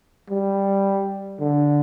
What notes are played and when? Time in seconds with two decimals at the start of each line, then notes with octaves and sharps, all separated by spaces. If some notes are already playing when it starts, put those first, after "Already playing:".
0.30 G3
1.40 D3